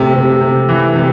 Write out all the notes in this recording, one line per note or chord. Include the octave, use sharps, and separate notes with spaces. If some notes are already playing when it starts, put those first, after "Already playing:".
Already playing: C3 A3
C3
C3
E3
C3